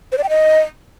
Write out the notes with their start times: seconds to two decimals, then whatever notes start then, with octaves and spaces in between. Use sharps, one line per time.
0.12 C5
0.18 D5
0.24 G5
0.29 D#5